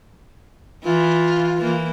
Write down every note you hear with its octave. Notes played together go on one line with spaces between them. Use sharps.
E3 F4
E3 A#3